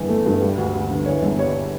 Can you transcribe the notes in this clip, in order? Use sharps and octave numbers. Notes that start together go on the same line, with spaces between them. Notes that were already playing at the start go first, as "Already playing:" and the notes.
Already playing: G1 E2 E3
A3
G2
G3
D2
D2
D3
E3 C#5
G1
G3 C#5